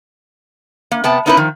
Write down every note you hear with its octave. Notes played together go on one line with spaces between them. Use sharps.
A#3
C3 B3 G5 A5
B3 C#4 D#4 E4 A#4 B4
D#3 F3